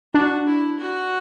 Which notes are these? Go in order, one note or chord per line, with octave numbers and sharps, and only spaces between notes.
D4 F#4
E4
F#4